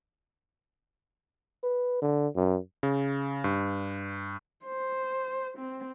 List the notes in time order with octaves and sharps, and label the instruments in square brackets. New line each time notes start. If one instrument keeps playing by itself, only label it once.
[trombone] B4
D3
F#2
[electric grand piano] C#3
G2
[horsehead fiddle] C5
C4